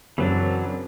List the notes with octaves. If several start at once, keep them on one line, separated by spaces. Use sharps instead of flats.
F#2 C#3 E3 F#3 C4 D4